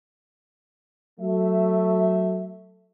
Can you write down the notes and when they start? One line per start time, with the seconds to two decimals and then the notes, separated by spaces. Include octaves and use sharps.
1.20 F#3 A3 E5